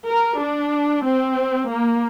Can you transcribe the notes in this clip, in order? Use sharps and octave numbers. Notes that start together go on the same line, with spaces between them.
A#4
D4
C4
A#3